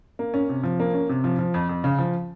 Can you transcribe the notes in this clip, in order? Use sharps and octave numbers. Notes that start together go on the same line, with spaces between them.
A#3
C#4
C3
F3
A#3
C#4
C3
F3
F3
F2
F2
C#3
F3